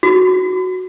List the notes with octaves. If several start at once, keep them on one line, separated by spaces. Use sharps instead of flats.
F#4